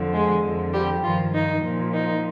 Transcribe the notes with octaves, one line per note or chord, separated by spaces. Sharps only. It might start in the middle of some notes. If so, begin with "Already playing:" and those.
Already playing: F2 D3 F3
G#3 G#4
F2 D3 F3
G3 G4
G2 D#3 F3 F4
D#4
A#2 F3
D#4